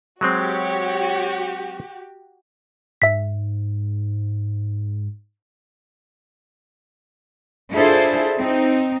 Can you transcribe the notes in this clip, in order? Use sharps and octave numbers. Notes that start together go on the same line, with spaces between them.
F#3 G#3 C4 F#4 G4 C#5
G#2 E5 B6
D4 E4 F4 G#4 A4 C5
C4 D#4